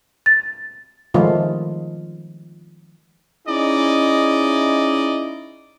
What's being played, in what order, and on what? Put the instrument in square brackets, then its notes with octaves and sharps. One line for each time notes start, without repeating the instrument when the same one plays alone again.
[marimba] A6
[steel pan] D#3 F3 G#3 A3 F4
[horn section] C#4 D#4 E4 G#4 D5 D#5